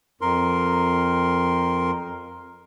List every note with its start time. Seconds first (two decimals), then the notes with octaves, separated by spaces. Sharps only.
0.21 F2 A#4 C6